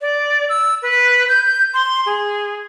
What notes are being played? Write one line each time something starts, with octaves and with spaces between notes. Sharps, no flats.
D5
E6
B4
G6
C6
G#4